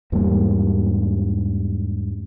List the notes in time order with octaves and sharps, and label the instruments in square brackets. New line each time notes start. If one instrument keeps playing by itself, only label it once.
[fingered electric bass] E2 G#2 G3 A#3